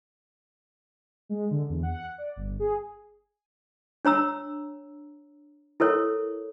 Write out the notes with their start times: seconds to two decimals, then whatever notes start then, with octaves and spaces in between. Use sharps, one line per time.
1.29 G#3
1.51 D3
1.69 E2
1.83 F#5
2.18 D5
2.36 G1
2.59 G#4
4.05 D4 C#5 A#5 E6
5.80 E4 A4 A#4 C#5